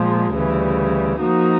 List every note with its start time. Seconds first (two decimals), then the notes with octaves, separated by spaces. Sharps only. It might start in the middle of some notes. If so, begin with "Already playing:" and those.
Already playing: A#2 F3 G#3
0.34 D2 C#3 E3 G3
1.19 F3 A#3 D#4 F#4